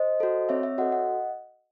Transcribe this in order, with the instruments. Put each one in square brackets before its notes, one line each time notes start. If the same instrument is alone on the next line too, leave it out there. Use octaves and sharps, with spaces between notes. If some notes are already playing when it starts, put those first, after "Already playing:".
Already playing: [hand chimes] C5 D#5
F#4 A4
C4 C#5 E5
C#5 E5
F#4 A4 D#5 F#5
D#5 F#5